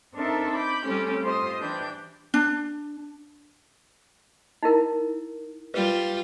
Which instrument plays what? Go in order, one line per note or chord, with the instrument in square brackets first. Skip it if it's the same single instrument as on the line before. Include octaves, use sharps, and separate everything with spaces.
[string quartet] C4 D4 D#4 A4 A#4 E5
B5 D6 G6
G3 A3 C4 C#4 G4
F4 G4 C5 D#5 C6 D#6
E3 D4 G4 G6
[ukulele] D4
[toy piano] D#4 E4 A#4
[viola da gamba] G3 F4 [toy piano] B4